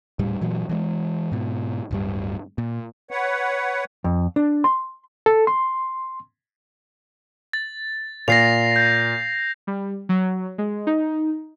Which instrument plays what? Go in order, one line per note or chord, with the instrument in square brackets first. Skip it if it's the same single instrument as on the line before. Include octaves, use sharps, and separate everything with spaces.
[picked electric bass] D#1 A2 G3
A#2 E3 F#3
E3 F#3 G#3
G#2 B2
D1 G2 G3
A#2
[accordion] B4 C#5 F#5
[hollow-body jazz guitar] F2
D4
C6
[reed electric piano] A4
C6
[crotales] A6
[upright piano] A#2 [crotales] A#6 C7 F7
[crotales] G6
[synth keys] G3
F#3
G#3
D#4